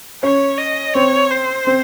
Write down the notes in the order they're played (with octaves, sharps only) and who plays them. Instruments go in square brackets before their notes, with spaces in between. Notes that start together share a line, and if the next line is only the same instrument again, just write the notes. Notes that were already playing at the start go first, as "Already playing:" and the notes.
[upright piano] C#4 [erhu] C#5
[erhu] D#5
[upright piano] C4 [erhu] C#5
[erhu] C5
[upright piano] C4